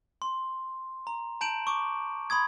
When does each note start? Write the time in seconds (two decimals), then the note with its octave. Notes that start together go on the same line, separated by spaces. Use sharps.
0.22 C6
1.07 A#5
1.41 A5 A#5 G6 D7 E7 F#7
1.67 C#6 D6
2.30 B5 C6 D#6 G#6